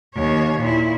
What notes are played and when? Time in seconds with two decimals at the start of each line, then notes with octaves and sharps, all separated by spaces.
0.15 D#2 C#5
0.60 A#2 E4